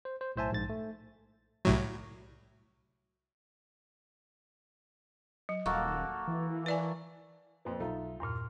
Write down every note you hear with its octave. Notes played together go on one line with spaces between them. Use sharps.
C5
C5
B1 A2 C5 E5 G#5 A5
A#1 G#2 A6
A3
C2 A2 F#3
F#3
D#1 A#3 F#4 A4 C#6
E3
B4 D5 G#5
F2 A#2 F3 B4
B1 D#4 F4 A4 E5
E2 G2 A#2 C6 F6